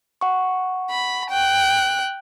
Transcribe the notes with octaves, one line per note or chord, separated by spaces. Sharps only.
F#5 C#6
B5
G5 F#6